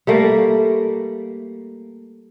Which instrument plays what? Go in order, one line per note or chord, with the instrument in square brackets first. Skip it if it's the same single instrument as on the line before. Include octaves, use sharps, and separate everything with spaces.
[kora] G3 A3 A#3